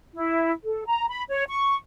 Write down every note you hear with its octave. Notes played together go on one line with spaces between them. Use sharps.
E4
A4
A#5
B5
C#5
C#6